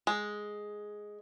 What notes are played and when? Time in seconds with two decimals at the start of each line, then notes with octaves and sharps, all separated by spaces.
0.07 G#3